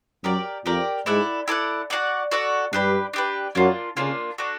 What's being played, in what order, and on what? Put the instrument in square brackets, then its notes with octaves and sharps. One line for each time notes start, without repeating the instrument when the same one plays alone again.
[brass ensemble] F#2 F#3 [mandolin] G4 A#4 D5
[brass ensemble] F2 F3 [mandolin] G4 A#4 D5
[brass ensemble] G#2 G#3 [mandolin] E4 A4 D5 F#5
[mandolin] E4 A4 D5 F#5
F#4 A4 D5 F#5
F#4 A4 D5 F#5
[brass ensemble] G2 G3 [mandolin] D4 G4 B4
[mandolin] D4 G4 B4
[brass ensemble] F#2 F#3 [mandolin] A#3 D4 F4
[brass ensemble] C#3 [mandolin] A#3 D4 F4
[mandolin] D4 F#4 A4